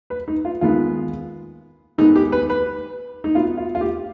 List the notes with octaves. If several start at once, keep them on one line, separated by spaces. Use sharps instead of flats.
B4
D#4
F4
D#2 D#3 G#3 B3 F4
G#2 D#3 G#3 B3 D#4
G4
B4
B4
D#4
B2 B3 F4
F4
F4
G4